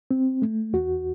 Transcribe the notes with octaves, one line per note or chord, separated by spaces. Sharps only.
C4
A3
E2 F#4